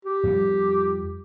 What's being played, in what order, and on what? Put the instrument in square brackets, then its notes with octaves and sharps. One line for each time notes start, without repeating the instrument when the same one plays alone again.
[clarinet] G4
[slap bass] F2 G3